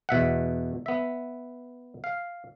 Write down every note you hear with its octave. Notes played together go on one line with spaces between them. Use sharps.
E2 B2 E5 F#5
B3 E5
F5